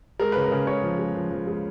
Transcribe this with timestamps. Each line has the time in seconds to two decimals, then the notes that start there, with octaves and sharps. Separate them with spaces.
0.20 G#3 A#4
0.32 C#3 B4
0.45 A#4
0.52 C#3
0.67 G#3 C#5
0.83 F3
0.99 G#3
1.15 F3
1.31 F3
1.47 G#3